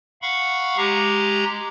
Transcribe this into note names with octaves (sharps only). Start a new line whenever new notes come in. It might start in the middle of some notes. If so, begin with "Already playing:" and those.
F5 F#5 B5 C#6
G#3 G4 A#5